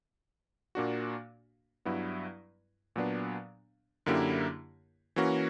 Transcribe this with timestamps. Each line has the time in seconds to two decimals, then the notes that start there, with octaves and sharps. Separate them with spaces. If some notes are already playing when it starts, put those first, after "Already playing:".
0.75 A#2 A#3 D4 F#4
1.85 G2 F#3 B3 E4
2.96 A#2 F#3 B3 D4
4.06 F#2 D3 A#3 E4 G4
5.16 E3 A#3 C#4 F#4